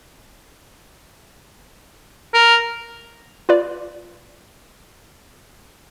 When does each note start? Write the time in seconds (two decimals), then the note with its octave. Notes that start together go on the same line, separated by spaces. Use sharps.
2.34 A#4
3.49 F4 B4 D5